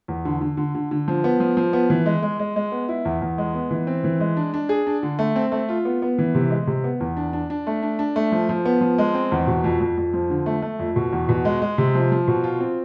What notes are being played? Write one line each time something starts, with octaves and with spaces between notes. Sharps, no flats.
E2
D3
D3
D3
D3
D3
F3
B3
F3
F3
B3
E3
G#3
G#3
G#3
G#3
B3
E4
E2
E2
G#3
B3
E3
C4
E3
G#3
D4
D4
G#4
D4
D3
A3
C4
A3
F4
B3
B3
E3
C3
G#3
C3
B3
E2
D4
D4
D4
A3
D4
D4
A3
F3
F3
B3
F3
G#3
C4
E2
B2
F2
F2
F2
F3
D3
A3
A3
F2
B2
E2
B2
G#3
G#3
C3
F3
F3
B2
F4
C4